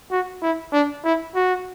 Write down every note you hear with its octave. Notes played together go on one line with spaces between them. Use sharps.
F#4
E4
D4
E4
F#4